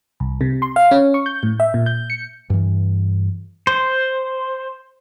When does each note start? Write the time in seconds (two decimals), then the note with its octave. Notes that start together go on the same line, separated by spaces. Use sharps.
0.20 C2
0.41 C3
0.62 C6
0.76 F5
0.91 C#4
1.14 C#6
1.26 G6
1.43 A2
1.60 E5
1.74 A#2
1.86 G6
2.10 C#7
2.50 G2 E3
3.67 C5